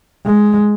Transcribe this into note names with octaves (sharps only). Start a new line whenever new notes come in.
G#3